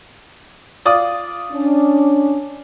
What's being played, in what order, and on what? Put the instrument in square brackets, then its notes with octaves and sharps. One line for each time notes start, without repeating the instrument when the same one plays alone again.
[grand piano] F4 D5 D#6
[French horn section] C#4 D4